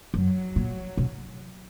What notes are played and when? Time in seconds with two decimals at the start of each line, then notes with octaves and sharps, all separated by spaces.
0.14 F#2 F#3
0.56 A#2
0.97 B2